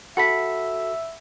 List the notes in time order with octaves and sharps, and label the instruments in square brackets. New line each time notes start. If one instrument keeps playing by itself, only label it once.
[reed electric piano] F#4 A4 [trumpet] E5 [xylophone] F#5 B5 B6